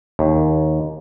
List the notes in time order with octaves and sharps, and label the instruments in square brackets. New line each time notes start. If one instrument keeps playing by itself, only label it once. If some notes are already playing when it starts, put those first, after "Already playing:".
[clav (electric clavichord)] D#2